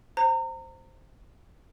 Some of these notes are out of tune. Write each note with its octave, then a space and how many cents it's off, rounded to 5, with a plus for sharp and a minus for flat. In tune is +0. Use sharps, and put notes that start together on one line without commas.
C5 +0 A#5 -30